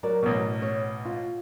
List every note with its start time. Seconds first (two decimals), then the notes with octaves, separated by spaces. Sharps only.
0.03 F#3 A#4 D5
0.23 A1 B2
0.62 C#5
1.05 F4